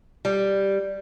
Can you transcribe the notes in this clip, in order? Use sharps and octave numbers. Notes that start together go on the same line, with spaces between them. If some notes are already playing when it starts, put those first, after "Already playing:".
G3